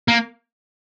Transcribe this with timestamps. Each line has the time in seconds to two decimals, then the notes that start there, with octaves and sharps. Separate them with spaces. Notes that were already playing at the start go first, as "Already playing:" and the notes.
0.08 A#3